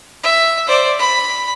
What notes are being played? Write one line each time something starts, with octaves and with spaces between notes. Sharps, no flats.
E5
C5 D5
B5